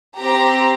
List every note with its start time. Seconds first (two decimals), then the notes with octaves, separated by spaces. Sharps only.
0.19 C4 G4 A#5